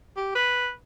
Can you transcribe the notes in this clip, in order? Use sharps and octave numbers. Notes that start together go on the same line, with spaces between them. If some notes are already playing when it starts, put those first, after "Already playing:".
G4
B4